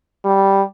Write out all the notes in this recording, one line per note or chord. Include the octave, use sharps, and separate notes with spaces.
G3